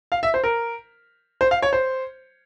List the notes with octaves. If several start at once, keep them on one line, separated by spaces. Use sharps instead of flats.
F5
E5
C5
A#4
C5
F5
C#5
C5